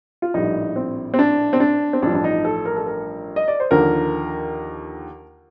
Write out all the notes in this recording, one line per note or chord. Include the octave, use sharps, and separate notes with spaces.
F4
A#1 A2 G3 D#4
C4
C4
D4
C4
D4
C4
A1 G2 F3 D4
D4
D#4
A4
A#4
A4
A#4
D#5
D5
C5
D#2 D3 F3 A#4